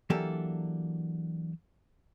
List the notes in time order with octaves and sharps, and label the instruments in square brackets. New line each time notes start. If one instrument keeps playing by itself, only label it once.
[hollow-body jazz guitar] E3 F#3 A#3 D4 G4 A4